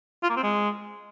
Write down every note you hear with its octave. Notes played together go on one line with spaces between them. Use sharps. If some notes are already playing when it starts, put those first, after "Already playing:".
F4
A#3
C4
G#3